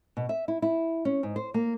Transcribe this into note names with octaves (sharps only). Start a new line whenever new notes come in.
B2
E5
E4
E4
C#4
G#2
C5
A#3